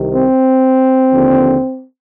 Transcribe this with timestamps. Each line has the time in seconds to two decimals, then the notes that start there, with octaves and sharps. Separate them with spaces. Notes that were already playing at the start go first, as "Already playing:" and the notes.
Already playing: C2 C3 D#3
0.15 C4
1.12 D#2 D3 F3